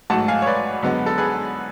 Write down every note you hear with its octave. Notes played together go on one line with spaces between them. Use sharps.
A1 G#2 F#3 A3 F#5 A5
F5 G#5
C#5
B4 D5
F#2 D3 G#3 B3
A4
G#4 B4